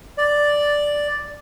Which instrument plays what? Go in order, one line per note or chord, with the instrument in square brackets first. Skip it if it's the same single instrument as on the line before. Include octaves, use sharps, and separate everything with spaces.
[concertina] D5